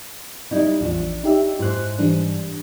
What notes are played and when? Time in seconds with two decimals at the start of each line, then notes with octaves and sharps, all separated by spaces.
0.51 G3 D#4 E4
0.81 A1 E2 F3 D4
1.24 D#4 G4 E5
1.59 G#2 E4 C5 F#6
1.99 E3 G3 D4